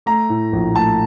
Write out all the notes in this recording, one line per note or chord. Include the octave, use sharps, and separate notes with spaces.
A3 A#5
A2
A#1
A3 A5